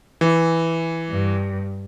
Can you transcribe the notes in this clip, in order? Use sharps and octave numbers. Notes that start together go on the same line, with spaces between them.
E3
G2